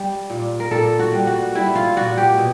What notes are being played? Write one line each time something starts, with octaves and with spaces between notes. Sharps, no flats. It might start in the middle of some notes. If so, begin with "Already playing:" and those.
Already playing: G3
A#2
A#4
A#2 A4
F#4
G3
F#4
G3 E4
F4
A#2 F#4
G4
B2